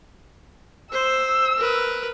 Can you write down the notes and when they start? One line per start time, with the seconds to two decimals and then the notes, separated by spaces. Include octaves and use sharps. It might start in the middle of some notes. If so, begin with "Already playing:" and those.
0.92 C5 E6
1.57 A#4 B4